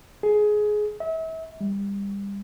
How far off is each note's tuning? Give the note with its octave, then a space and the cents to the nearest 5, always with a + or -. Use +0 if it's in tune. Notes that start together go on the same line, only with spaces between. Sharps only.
G#4 +15
E5 -35
G3 +30